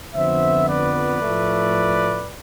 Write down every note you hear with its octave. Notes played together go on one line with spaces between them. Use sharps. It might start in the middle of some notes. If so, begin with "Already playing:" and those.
F2 D3 F3 B3 C5 E5
B4 D5
A2 F3 A3